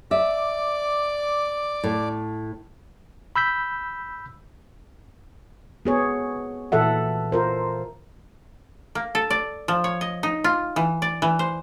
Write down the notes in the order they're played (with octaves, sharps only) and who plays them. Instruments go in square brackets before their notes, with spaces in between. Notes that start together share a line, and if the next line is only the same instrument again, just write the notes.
[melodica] D5 D6 [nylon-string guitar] E5
[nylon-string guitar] A2
[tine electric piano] B5 E6 G6 B6
[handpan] B3 G#4 C#5
A#2 E3 A4 E5 F#5
F4 A#4 C5
[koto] A#3
A4
D5
F3
C#5
D#5
D#4
F4
E3
D5
E3
C5